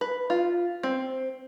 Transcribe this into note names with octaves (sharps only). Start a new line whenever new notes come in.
B4
F4
C4